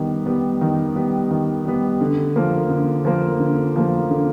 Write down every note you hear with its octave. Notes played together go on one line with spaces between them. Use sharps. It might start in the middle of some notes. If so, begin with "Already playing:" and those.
Already playing: D#3 G3 B3
G3 B3
D#3
G3 B3
D#3
G3 B3
D3
F3 A#3
D3
F3 A#3
D3
F3 A#3
D3